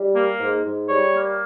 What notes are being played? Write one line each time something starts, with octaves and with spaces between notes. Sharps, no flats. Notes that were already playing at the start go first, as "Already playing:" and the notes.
Already playing: G3
A#3
G#2
G#2
G3 C#5
A#3